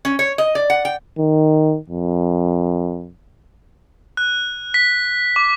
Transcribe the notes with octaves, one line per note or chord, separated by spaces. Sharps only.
C#4
C#5
D#5
D5
F#5
G5
D#3
F2
F#6
B6
D6